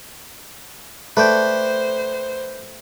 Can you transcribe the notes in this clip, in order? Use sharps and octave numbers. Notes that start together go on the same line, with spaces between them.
A3 B4 C5 D5 G5